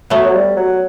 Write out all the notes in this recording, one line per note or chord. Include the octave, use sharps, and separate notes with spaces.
F#3 A3 B3
F#3
G3
F#3